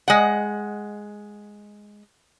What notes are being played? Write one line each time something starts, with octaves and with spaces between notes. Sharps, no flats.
G#3 F#5